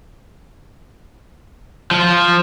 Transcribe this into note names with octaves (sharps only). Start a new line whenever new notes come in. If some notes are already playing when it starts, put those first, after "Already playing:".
F3